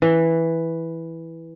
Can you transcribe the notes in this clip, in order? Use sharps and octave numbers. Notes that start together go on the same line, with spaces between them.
E3